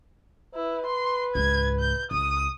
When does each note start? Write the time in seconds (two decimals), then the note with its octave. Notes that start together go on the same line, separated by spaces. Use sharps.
0.55 E4 B4
0.86 C6
1.35 C#2 G#2 G#6
1.80 G6
2.11 C#2 D#6